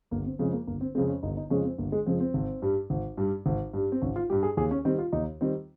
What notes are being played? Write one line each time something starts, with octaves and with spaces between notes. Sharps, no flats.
G1 A#3
C4
F2 C#3 F3 G#3 C4
A#3
G1 A#3
C4
F2 C#3 F3 G#3 C4
C#4
G1 D#4
D#4
F2 C#3 F3 G#3 C#4
C4
G1 A#3
G#3
F2 C#3 F3 G#3 C4
C4
G#1
G2 G3
G#1
G2 G3
G#1
G2 G3
C4
G#1 C#4
F4
G2 G3 G4
G#4
D#2 G#4
C#4
D#3 G3 C4
F4
D#2 D#4
D#3 G3 C4